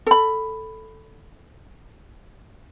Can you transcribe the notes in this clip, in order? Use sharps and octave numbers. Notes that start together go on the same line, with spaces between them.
A4 B5